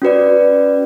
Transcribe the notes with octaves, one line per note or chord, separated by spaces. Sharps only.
C#4 F#4 B4 D5